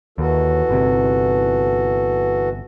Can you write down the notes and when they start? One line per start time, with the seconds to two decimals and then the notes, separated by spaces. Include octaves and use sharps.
0.18 D#2 E3 F#4 A4
0.69 G1 C3